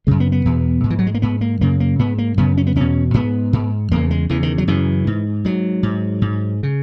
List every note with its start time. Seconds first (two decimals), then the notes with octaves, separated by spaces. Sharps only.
0.07 F#2 C#3 G#3
0.20 B3
0.32 B3
0.45 E2 B2
0.84 G#2
0.90 E3
0.99 F#3
1.07 G#3
1.14 A#3
1.22 G#2 B3
1.41 A#3
1.61 F#2 C#3 A#3
1.80 A#3
1.99 G#2 B3
2.18 A#3
2.38 F#2 C#3 B3
2.57 C#4
2.67 B3
2.76 E2 B2 C#4
3.14 G#2 B3
3.53 G#2
3.91 E2 C#3 A#3
4.11 G#3
4.29 E2 C#3 E3
4.43 D#3
4.58 F#3
4.68 F#2 C#3 E3
5.07 G#2
5.45 G#2 F#3
5.83 G#2
6.22 G#2
6.63 C#3